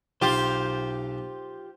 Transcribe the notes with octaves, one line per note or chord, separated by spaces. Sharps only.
B1 F4 G4 C5